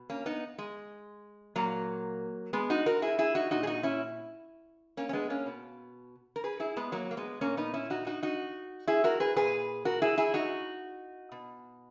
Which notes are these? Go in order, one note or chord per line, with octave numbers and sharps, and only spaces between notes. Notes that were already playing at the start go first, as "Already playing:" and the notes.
Already playing: B2
A#3 C#4
B3 D#4
G#3
A#2 F#3 A#3
G#3 B3
D#4 F#4
F#4 A#4
E4 G#4
E4 G#4
D#4 F#4
A#2 D#4 F#4
G#4
D#4 F#4
C#4 E4
A#3 C#4
C#4
G#3 B3
A#3 C#4
B2
A#4
G#4 B4
E4 G#4
G#3 B3
F#3 A#3
A#3
G#3 B3
A#2 A#3 C#4
B3 D#4
C#4 E4
D#4 F#4
D#4 F#4
D#4 F#4
E4 G#4
F#4 A#4
G#4 B4
A#2 G#4 B4
F#4 A#4
E4 G#4
E4 G#4
D#4 F#4
B2